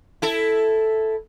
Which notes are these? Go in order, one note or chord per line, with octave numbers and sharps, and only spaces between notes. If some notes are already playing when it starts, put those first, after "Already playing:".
E4 A4